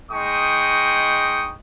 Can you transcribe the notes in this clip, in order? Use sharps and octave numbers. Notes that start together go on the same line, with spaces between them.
G#3 D#4 G5 C#6 D#6